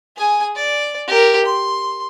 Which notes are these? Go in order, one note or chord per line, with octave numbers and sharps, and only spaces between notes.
G#4 G#5
D5
G4 A#4
C6